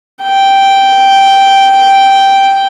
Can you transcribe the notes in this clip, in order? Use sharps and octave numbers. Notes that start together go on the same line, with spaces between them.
G5